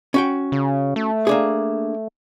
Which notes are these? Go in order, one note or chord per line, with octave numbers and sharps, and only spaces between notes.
C#4 F#4 G5
C#3
A3
A#3 D4 G#4